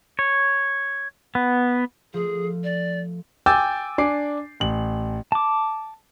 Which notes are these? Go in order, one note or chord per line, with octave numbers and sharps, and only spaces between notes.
C#5
B3
F3 A3 G#4
D5
G5 G#5 D6 E6 G6 A6
D4 G#5 D6 C7
A1 F#7
A5 D6